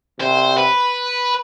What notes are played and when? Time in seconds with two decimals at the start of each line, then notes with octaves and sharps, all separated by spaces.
0.20 C3 C5
0.57 B4